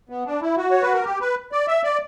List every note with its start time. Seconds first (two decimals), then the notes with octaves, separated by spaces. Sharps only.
0.09 B3
0.26 D4
0.42 E4
0.57 F#4
0.71 C#5
0.82 B4
0.94 A#4
1.04 G4
1.21 B4
1.52 D5
1.67 E5
1.84 D5